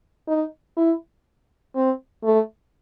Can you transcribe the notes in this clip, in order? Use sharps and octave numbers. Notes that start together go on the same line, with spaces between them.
D#4
E4
C4
A3